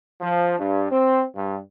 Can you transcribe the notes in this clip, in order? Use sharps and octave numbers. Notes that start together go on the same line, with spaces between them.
F3
G2
C4
G2